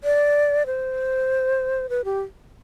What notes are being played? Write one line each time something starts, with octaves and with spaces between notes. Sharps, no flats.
D5
C5
B4
G4